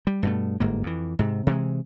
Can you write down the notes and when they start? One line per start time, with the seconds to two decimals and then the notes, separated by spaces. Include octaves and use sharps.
0.07 G3
0.23 G2 B2 A3
0.60 G1 G#2 A#3
0.83 F2 E3
1.19 G#2 C3
1.47 C3 E3 F3 G#3